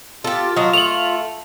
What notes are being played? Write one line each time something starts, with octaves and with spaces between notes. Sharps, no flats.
F4 G4 A4
F#3 D#5
A3 F7 F#7